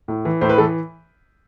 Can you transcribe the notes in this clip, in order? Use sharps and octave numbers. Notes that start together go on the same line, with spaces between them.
A2
E3
A2 C5
B4
E3 A4